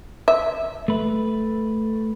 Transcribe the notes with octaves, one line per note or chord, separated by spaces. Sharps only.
E5
A3 B4